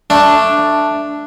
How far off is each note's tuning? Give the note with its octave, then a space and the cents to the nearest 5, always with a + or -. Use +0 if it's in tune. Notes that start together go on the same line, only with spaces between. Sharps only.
A3 +0 D4 +0